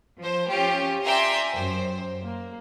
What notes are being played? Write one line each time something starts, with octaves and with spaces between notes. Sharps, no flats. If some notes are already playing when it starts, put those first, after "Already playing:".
F3 C5
C#4 F4 G4
D5 E5 G5 G#5 A#5 C6
F#2 C5
A#3